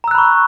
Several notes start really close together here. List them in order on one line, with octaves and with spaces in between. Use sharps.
A#5 E6 F#6 B5 C#6